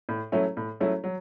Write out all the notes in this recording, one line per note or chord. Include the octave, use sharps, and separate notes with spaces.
A2
F#3 A3 C#4 E4
A2
F#3 A3 C#4 E4
F#3